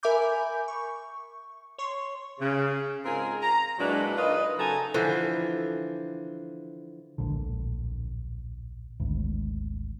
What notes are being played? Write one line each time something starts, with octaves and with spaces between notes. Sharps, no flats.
A#4 E5 G#5 B5 D6 G6
C#6
C#5 C6 C#6
C#3
G#2 C4 F4 G#4 A#4
A#5
A#2 F#3 G#3 D4 E4 B4
D#4 F4 A#4 B4 D5 D#5
C#3 F#3 D#4 A4 G#5 A#5
D3 E3 F3
D1 A#1 D3
G#1 D2